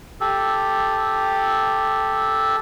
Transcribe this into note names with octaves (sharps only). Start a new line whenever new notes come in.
G4 A4